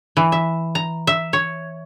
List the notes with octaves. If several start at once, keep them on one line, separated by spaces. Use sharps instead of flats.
E3
E5
A#5
E5
C#5